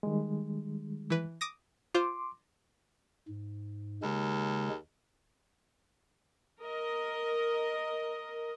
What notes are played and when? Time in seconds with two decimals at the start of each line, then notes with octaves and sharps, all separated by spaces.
0.03 D#3 G3 G#3
1.10 E3 B4
1.41 D6 D#6 A#6
1.94 F4 C5 C6 D6
3.28 G#2
4.03 D#2 C#3 G#3
6.60 A#4 D#5